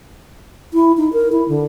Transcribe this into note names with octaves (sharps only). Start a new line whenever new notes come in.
E4
D#4
A#4
E4
D3